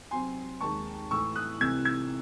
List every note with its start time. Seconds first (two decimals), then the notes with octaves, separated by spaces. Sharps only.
0.11 C3 F#3 C4 G#5 C6
0.61 D#2 D#3 G#3 A5 C#6
1.11 A2 E3 A3 C#6 E6
1.35 D#6 F#6
1.60 C2 C3 E3 A3 E6 G#6
1.85 E6 G#6